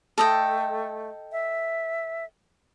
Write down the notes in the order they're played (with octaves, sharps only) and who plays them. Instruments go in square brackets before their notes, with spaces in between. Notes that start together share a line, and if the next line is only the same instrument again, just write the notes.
[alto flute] A3 [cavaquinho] A4 D#5 G5
[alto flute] E5